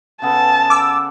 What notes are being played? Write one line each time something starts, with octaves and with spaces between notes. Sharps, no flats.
C#3 B3 A4 A5
D6 E6